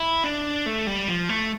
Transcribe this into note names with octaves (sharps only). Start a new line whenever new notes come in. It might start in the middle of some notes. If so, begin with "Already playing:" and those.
Already playing: E4
D4
A3
G3
F3
A3